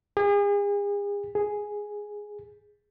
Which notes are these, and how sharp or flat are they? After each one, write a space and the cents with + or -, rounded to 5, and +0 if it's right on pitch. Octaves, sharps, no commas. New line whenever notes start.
G#4 -40
G#4 +0